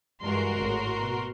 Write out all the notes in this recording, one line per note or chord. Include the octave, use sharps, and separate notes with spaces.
G2 E3 G#3 F#4 A#4 C6
G#1 A2
B2